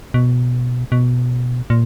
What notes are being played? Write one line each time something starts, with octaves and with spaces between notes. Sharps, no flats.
B2
B2
A#2